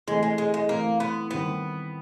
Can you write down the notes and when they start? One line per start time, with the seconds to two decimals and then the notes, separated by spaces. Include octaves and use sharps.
0.08 E3 G#3 A3 C4
0.23 G#3
0.38 G#3
0.54 G#3
0.69 E3 A3 A#3 C4
1.00 B3
1.31 D#3 G3 B3 C4 E4